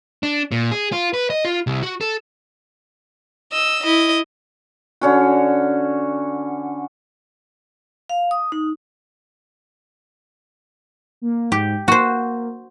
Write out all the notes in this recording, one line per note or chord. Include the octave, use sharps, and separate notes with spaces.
D4
A#2
G#4
F4
B4
D#5
F4
C2
F#4
A4
D#5 E6
E4 D#5
D3 C#4 F#4
F5
D#6
D#4
A#3
G#2 G4
A#3 F#4 C5